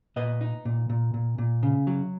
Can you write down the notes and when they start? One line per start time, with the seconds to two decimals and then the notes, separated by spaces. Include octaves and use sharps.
0.16 A#2 B4 D#5
0.41 D#4
0.65 A#2
0.90 A#2
1.14 A#2
1.38 A#2
1.63 C#3
1.87 F#3